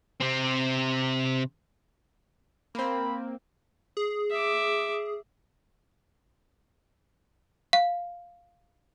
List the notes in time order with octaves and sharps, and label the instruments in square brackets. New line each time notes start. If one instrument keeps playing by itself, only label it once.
[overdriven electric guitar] C3 C4
[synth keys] A#3 C4 [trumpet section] B5
[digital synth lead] G#4
[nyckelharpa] E5 D6
[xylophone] F5